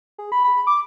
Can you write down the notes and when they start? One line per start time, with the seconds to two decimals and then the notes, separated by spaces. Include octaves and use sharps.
0.18 G#4
0.32 B5
0.44 B5
0.67 D6